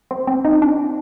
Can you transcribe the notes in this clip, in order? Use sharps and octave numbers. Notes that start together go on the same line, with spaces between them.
C4
C4
D#4
D4